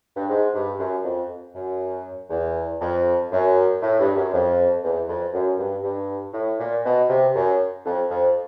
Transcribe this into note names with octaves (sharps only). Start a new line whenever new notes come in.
G2
G#2
G2
F#2
F2
F#2
E2
F2
F#2
A2
G2
F#2
F2
E2
F2
F#2
G2
G2
A2
A#2
B2
C3
F#2
F2
F2